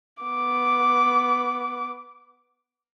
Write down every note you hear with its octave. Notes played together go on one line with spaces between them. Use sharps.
B3 D6